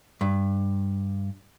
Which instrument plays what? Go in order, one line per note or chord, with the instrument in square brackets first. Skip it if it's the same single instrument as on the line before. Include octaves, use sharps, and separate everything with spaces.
[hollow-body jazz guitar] G2